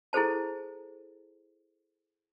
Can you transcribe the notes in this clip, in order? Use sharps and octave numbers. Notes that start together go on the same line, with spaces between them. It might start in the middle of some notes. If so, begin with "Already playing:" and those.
E4 G#4 A4 C5 A5